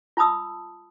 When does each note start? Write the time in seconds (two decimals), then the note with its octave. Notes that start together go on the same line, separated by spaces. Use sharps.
0.17 F4 A5 B5 D#6 E6